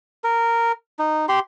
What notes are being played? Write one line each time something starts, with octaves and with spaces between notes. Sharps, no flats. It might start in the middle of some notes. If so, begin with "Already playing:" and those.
A#4
D#4
G4 C6